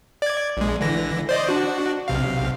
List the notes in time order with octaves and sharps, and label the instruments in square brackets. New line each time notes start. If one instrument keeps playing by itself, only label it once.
[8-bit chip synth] D5 G#6
A#1 G#3
D3 E3 A#6
C5 D5 D#5
D4 F#4
B1 C3 F5